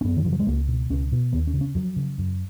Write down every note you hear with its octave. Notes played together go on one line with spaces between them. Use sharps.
C#4
F#2 B3
D#3
C#3 F3
F#3
G#3
C#2 A#3
B2
C#2 C#4
B2
D#2 B3
C#4
C#3
C#4
F2 F#3
C#3
F#2